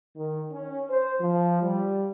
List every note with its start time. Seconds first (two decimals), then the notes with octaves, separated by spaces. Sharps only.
0.17 D#3
0.52 C#4
0.90 C5
1.21 F3
1.62 G3